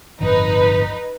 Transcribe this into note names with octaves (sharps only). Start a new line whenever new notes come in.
D1 G1 F2 D#4 B4